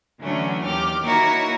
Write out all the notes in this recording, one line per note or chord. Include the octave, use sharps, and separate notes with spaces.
D3 E3 F#3 A3 C#4 D4
D#2 G4 D6 F6
A#3 D#4 E4 F#4 A#4 C#5